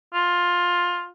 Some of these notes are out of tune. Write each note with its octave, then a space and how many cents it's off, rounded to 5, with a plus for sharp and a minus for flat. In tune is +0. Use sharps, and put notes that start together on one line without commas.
F4 +15